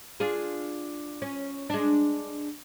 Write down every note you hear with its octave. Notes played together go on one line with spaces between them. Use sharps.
D4 F4 G#4
C#4
G#3 D4